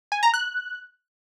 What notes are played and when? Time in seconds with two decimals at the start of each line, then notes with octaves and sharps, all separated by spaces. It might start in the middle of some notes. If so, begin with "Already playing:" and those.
0.12 G#5
0.23 A#5
0.34 F#6